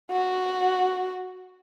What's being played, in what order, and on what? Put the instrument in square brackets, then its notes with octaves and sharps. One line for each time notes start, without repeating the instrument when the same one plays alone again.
[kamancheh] F#4